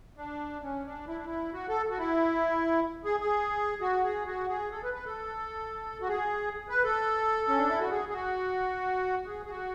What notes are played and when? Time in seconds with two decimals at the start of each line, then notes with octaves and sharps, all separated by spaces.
0.17 D4
0.62 C#4
0.85 D4
1.08 E4
1.16 D4
1.26 E4
1.53 F#4
1.69 A4
1.90 F#4
1.98 E4
3.05 G#4
3.20 G#4
3.81 F#4
4.03 G#4
4.26 F#4
4.49 G#4
4.72 A4
4.83 B4
4.94 B4
5.06 A4
6.01 F#4
6.08 G#4
6.69 B4
6.84 A4
7.48 C#4
7.58 D4
7.69 E4
7.80 F#4
7.90 G#4
8.09 G#4
8.13 F#4
9.26 G#4
9.46 G#4
9.49 F#4